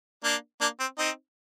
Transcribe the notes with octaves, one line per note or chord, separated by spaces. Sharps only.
A#3 D4
A#3 D4
C4
C4 D#4